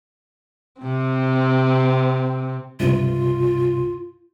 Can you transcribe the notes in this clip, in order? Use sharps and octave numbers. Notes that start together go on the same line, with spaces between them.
C3 C4
C#2 G2 C3 F4